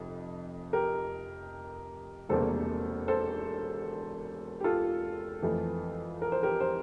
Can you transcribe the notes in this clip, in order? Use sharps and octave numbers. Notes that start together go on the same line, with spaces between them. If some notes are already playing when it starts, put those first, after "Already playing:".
Already playing: F1 F2
G4 A#4
E1 E2 C3 G3 A#3 A4 C5
A4 C5
G4
F4 A4
F2 E3 A3
A#4
C5
G4 A#4
C5